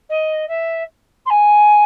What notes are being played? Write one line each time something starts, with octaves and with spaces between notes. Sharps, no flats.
D#5
E5
C6
G#5